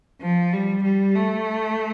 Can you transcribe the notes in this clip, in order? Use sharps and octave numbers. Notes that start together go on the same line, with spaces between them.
F3
G3
G3
A3